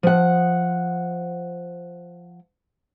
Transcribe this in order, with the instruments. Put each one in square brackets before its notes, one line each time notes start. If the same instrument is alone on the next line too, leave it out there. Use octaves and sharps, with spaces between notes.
[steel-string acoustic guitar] F3 F#5